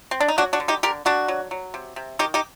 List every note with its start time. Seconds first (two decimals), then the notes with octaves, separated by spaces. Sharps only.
0.11 C4
0.20 D4
0.28 D#4
0.38 F#3 D4 F#4
0.53 D4 F#4
0.60 D3
0.68 D#4 G4
0.83 D3 G4 A#4
1.05 D3 D4 F#4
1.28 F#3
1.51 F#3
1.74 C3
1.96 C3
2.19 D#3 D#4 G4
2.34 D#4 G4